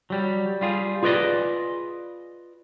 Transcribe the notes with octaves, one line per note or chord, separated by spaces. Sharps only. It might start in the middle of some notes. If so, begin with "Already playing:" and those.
F#3 G3
G3 F4 G#4
F4 G#4 B4 D5 D#5